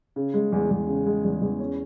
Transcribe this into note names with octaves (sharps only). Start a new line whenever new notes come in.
C#3
G#3
E2
E2
C#3
G#3
E2
E2
C#4